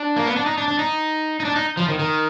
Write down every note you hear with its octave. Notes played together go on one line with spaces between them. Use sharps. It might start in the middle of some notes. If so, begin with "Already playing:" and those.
Already playing: D4
A#3
B3
D4
D#4
D4
D4
D#4
D#4
D4
D#4
F3
D#3
D#3